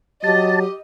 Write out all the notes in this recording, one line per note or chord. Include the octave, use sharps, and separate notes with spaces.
F#3 G4 D#5 A5